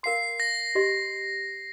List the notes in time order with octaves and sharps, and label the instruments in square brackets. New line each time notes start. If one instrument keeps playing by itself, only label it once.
[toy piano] A#4 F5 C6 [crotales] C7
[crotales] A#6
[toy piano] G4 D#5 C6